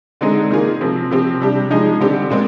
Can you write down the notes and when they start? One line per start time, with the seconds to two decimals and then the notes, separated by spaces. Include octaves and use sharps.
0.21 D3 G#3 C4 D#4 G#4
0.50 D#3 A#3 F4 G#4
0.81 C3 F3 C4
1.10 C3 F3 C4 G4
1.40 C3 G3 D4 G4
1.71 F3 G#3 D#4 G#4
2.00 D3 G3 C4 G4
2.30 A#2 G#3 C4